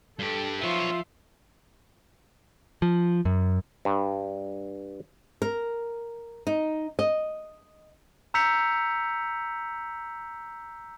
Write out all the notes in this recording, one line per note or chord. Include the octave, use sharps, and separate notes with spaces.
G2 G4 A4
F3 B3 C#5 E5 F5 C6
F3
F#2
G2
A#4
D#4
D#5
A#5 E6 G6 B6 C#7 F7